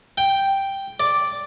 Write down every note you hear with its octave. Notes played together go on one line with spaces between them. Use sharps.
G5
D5